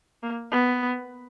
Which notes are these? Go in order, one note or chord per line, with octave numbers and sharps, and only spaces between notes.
A#3
B3